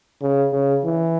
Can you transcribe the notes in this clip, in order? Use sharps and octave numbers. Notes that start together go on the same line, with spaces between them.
C#3
C#3
E3